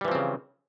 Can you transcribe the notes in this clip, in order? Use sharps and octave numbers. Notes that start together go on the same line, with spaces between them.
C#3 E3 F3 G3 C4